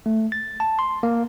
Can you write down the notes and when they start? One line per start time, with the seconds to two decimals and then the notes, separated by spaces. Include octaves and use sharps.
0.06 A3
0.32 A6
0.60 A5
0.79 C6
1.03 A#3